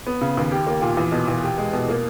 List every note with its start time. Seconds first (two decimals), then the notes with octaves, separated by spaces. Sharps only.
0.07 B3
0.21 C#3
0.37 D#2
0.52 G4
0.67 A#3
0.82 A#2
0.97 E2
1.12 B2
1.28 E2
1.43 G4
1.58 G#3
1.73 B2
1.89 A#3